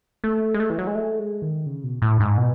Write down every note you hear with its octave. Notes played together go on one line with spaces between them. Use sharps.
A3
G#3
A3
E3
F#3
G#3
A3
G#3
D#3
C#3
B2
A2
G#2
B2